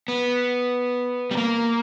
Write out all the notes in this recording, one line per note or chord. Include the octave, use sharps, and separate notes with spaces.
B3
G3
A#3